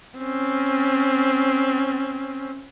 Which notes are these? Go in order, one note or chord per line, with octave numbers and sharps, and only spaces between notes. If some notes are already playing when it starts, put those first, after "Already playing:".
C4 C#4